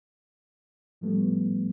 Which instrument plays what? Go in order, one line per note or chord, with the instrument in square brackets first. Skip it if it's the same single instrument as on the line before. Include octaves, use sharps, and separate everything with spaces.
[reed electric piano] A2 F3 G3 A3 B3